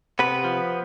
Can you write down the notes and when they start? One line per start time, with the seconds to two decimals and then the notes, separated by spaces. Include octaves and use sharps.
0.19 C3 B3 B4
0.44 F3